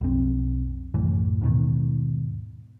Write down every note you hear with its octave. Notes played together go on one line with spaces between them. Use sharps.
B1 F2 C4
C2 F#2 A2 E3
D#2 G#2 B2 D#3